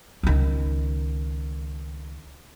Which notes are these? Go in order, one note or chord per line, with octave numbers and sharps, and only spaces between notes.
C#2 D#3